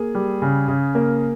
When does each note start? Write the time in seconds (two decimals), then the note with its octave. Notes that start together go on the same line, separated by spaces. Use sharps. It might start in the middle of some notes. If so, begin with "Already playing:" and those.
Already playing: A#3 G#4
0.15 G3
0.42 C#3
0.68 C#3
0.95 A#3